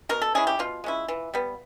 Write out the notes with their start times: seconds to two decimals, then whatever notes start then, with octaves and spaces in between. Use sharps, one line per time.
0.09 B2 A#4
0.22 A4
0.35 G#3 C#4 E4 G#4
0.47 G4
0.59 B2 F4
0.84 G#3 C#4 E4
1.08 E3
1.34 G3 B3